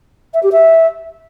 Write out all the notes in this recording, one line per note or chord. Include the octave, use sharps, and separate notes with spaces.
E5
G4
E5